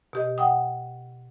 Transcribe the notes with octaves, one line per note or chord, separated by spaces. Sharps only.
B2 G4 D#5
F#5 G5 D#6